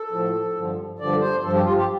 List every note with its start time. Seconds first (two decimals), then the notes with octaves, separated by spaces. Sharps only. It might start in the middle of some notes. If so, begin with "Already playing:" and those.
Already playing: A4
0.11 A2 F3
0.56 G2 D3 F3
0.99 G2 D3 F3 D5
1.21 C5
1.43 G2 F3 A4
1.54 G4
1.65 F4
1.77 G4